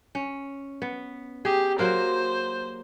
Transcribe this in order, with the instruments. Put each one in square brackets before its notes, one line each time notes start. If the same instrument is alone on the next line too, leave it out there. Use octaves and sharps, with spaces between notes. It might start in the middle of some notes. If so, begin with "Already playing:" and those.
[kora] C#4
B3
[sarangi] G4 [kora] G#4
[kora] F#3 A#3 A#4 [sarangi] C5